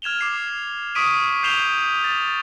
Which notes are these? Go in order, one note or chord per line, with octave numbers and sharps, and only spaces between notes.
F6 G#6 E7 F7 G7
D6 C7 E7
C#6 D#6 B6 D7 D#7
G6 C7 E7 F7 G7
A6